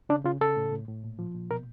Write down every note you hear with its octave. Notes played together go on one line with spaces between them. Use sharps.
C#3 D4
C#3 F4
C#3 A4
A2
A2
A2
A#2
F3
A#2
B2 A#4